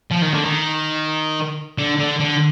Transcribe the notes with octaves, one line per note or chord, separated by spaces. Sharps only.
F3
D#3
D3
D#3
D3
D3
D3